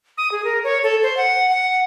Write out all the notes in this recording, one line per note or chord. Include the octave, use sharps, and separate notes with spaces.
D#6
G#4
A#4
C#5
A4
C5
F#5
F#5